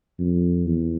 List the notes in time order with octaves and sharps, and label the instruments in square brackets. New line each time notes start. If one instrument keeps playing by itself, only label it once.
[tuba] F2
E2